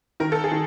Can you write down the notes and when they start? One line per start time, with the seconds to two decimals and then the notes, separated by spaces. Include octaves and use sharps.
0.20 D#3 A#4
0.32 A4
0.44 G#4
0.51 D#3